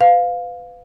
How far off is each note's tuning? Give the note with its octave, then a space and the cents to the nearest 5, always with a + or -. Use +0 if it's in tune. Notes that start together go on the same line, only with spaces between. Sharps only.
B4 +30 F5 +10